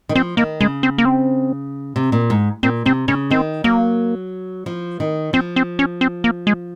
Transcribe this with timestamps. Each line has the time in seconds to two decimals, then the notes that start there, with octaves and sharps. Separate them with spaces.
0.09 D#3
0.15 F3 C4
0.37 D#3 A#3
0.60 C#3 G#3
0.83 C4
0.98 A#3
1.05 C4
1.96 C3
2.12 A#2
2.30 G#2
2.63 A#2 C4
2.86 C3 C4
3.08 C#3 C#4
3.30 D#3 C4
3.64 F#3 A#3
4.66 F3
5.00 D#3
5.33 F3 C4
5.56 C4
5.79 C#4
6.01 C4
6.24 A#3
6.47 G#3